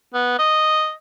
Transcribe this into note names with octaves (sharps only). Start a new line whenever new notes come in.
B3
D#5